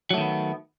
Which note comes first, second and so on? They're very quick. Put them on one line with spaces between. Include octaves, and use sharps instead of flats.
F#3 A3 D#3 B3